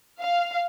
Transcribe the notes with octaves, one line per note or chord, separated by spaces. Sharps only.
F5